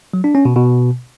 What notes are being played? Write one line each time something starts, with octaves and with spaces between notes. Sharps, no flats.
F#3
D4
C#4
B2
B2